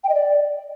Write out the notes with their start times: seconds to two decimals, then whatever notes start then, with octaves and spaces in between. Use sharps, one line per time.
0.04 G5
0.09 D#5
0.15 D5